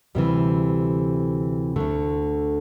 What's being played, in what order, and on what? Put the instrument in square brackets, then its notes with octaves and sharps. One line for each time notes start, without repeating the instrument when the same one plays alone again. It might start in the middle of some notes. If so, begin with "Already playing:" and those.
[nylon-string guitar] D2 C3 E3 G3
D2 D3 A3